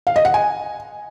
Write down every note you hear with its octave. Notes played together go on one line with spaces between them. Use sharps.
F5
D#5
F#5
G#5